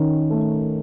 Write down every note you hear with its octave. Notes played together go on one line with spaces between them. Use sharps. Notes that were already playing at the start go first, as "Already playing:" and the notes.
Already playing: D#3 C#4
A3